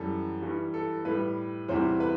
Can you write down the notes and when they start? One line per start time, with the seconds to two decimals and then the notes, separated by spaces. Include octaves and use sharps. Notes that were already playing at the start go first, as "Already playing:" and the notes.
Already playing: F#2 E3 G3 A4
0.42 G2 E3 G3
0.74 A4
1.05 A2 G3 B4
1.68 E2 C3 E3 G3 C5
2.00 B4